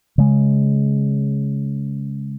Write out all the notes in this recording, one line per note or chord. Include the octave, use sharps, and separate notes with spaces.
C#3 G#3